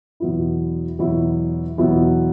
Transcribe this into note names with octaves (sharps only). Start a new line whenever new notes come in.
E2 B2 F#3 B3 E4
E2 B2 F#3 B3 E4
E2 B2 F#3 B3 E4